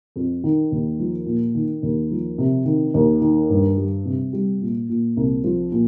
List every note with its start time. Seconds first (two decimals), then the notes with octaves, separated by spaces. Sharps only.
0.16 F2
0.44 D#3
0.72 D#2
0.99 F3
1.26 A#2
1.55 D#3
1.83 D#2
2.11 F3
2.38 C3
2.65 D#3
2.94 D#2
3.21 D#3
3.49 G2
3.77 G3
4.05 C3
4.33 G3
4.61 A#2
4.89 A#2
5.17 C2
5.44 F3
5.72 A#2